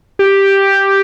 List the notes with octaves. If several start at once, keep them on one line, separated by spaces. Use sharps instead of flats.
G4